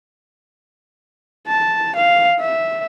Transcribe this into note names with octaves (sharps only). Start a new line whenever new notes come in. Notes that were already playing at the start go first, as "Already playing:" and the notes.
A5
F5
E5